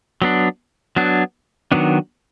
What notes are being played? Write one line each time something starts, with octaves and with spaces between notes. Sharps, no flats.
F#3 B3 D4
F#3 B3 D4
D#3 F#3 B3 D4